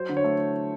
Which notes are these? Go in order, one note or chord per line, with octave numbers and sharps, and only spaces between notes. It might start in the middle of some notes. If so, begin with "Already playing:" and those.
Already playing: F#3 C5
D3
C#5
A3